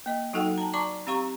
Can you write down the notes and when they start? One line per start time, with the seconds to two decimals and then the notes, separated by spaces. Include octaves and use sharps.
0.06 A#3 D#5
0.33 F#3 D#4 F#4 A4 F#5 G5
0.58 A5 A#5
0.74 D5 A5 A#5 C#6 D6
1.07 C4 G4 F5 A#5 C#6